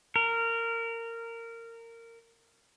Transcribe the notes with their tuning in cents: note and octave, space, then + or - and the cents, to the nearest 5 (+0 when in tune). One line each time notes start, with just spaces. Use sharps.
A#4 -20